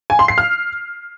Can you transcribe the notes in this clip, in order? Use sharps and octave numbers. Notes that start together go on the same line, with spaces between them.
G#5
C6
C7
F6